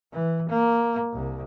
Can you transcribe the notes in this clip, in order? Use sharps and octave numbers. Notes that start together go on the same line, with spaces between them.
E3
A#3
C2